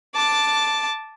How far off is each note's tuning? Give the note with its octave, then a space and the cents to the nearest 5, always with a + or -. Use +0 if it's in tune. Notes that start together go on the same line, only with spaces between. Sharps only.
A5 +0 D6 +0